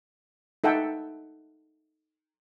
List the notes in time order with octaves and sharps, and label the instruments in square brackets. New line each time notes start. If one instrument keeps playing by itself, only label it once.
[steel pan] D#4 A4 E5 F#5 G5